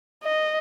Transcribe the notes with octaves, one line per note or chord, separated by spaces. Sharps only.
D#5